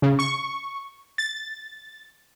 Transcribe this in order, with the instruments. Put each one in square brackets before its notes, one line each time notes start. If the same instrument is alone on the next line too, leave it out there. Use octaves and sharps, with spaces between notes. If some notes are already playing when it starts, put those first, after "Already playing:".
[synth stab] C#3
C#6
A6